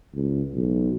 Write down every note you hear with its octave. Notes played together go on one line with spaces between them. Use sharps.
C#2
B1